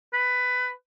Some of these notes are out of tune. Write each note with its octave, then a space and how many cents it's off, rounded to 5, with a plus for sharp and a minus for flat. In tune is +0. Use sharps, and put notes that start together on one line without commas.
B4 +15